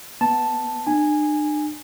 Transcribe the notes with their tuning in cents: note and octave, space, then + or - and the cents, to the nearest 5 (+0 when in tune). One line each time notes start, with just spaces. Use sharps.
B3 +0 A5 +0
D4 +45 G#5 -5